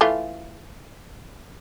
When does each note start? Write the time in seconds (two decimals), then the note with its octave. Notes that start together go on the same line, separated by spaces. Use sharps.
0.01 E3 A3 F4